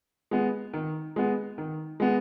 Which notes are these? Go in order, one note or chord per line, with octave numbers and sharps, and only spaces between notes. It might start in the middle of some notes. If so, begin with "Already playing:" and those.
G#3 B3
D#3
G#3 B3
D#3
G#3 B3